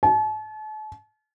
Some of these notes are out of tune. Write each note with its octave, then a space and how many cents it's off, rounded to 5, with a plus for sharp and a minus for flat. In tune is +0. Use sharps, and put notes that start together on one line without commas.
A5 -40